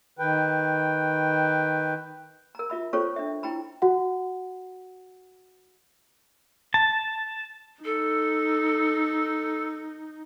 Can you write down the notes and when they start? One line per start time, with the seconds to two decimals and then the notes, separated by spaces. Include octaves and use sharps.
0.19 D#3 B4 G5
2.55 A#4 A#5
2.70 F4 E5 B5
2.93 C#4 F4 A4 C5 C#5 C#6
3.16 D4 E5
3.43 E4 G5 A#5 B5
3.82 F#4 F#5
6.74 A5
7.85 D#4 A4